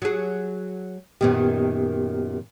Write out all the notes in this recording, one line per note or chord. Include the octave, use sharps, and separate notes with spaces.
F#3 G#4
F#2 A#2 D#3 B3 G4